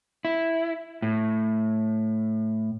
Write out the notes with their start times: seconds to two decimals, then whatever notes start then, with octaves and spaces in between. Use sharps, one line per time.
0.25 E4
1.02 A2